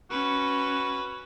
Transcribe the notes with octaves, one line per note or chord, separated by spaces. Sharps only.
C#4 F#4 B4